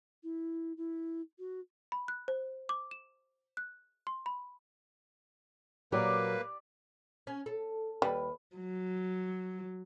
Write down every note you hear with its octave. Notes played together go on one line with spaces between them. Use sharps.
E4
E4
F#4
B5
F#6
C5
D6
E7
F#6
C6
B5
A#2 F#3 A#3 G4 A#4 B4 D5
C#4
A4
D#2 G3 B4
F#3